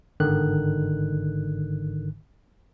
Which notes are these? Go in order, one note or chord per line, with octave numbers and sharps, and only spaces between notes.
G1 G#2 D3 D#3 F#6